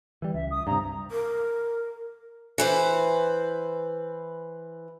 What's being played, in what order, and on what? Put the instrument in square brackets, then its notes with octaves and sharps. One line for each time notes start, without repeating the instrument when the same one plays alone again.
[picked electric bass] E3 G3
[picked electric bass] C#2 [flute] E5
[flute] D#6
[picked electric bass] G2 C3 [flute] A#5
[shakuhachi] A#4
[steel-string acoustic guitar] E3 B4 C5